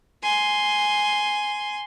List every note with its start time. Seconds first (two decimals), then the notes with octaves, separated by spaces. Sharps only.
0.23 G#5 C6